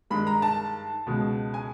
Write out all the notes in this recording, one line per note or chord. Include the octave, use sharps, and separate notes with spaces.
G2 D#3 G#3 B5
A#5
A5
C#2 B2 G#3
G#5